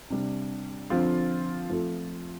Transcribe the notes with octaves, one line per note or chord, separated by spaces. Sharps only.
C3 G3 D4
D3 F3 C4 F4
F3 A3 C4 F4 A4